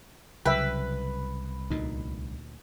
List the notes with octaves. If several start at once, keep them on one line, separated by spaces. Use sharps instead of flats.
C2 C#3 F#3 B4 E5 G5
D2 A#2 D#4